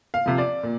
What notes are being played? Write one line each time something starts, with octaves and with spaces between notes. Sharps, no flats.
F5
C3 F3
D5
A#2